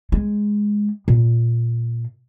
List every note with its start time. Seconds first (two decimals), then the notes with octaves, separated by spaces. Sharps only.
0.12 G#3
1.08 A#2